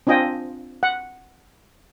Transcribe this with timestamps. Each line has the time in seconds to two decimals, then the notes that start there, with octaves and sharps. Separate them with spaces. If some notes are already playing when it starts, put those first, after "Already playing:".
0.07 C4 D4 F4 D#5 G5 G#5
0.83 F#5